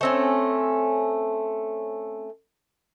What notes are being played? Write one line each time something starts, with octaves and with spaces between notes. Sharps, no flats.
A3 C4 C#4